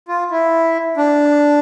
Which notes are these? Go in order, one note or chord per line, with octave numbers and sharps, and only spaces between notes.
F4
E4
D4